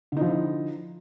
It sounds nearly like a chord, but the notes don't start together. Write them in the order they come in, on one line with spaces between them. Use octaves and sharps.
D3 D#4 F3 E4